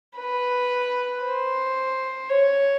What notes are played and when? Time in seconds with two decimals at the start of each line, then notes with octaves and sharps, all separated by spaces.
0.17 B4
1.23 C5
2.29 C#5